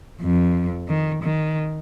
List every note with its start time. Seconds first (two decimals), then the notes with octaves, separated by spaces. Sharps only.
0.21 F2
0.88 D#3
1.23 D#3